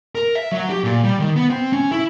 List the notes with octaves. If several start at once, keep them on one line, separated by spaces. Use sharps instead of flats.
A#4
E5
F#3
G4
A#2
G3
D#3
B3
C4
C#4
E4